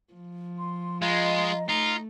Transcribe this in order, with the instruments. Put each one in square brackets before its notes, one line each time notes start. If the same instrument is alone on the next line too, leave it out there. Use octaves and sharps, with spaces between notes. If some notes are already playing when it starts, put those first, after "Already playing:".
[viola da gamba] F3
[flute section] C6
[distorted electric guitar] G#3 [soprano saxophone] F4 [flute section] D#5 A#5
[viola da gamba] A3 [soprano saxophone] D#4 [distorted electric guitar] F4